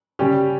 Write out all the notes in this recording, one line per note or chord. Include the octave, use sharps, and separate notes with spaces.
C#3 G3 C#4 G4